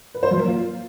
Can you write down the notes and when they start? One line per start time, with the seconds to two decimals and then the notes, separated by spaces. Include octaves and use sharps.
0.15 B4
0.23 C5
0.31 F#3
0.39 A#3
0.47 F4